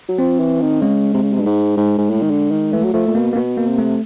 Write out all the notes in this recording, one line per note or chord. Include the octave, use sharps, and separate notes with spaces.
F#3
F3 C4
E3
D#3
C#3 G#3
C3
C#3
C3
G2
G#2
G#2
G#2
A2
D#3
D3
D#3
E3 A3
F#3
F3 A3
A#2
B2 A#3
A#3
B2 B3
A#3
C3
A3